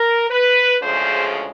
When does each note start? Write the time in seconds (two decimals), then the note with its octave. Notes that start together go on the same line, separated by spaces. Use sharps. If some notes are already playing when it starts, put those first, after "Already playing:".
Already playing: A#4
0.31 B4
0.82 D2 C#3 F3 G#3 C5